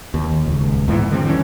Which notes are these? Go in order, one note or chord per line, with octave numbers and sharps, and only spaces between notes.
D#2
D#1 C#2
E2 G#2 E3 B3
D3 G3 C4
E3 C#4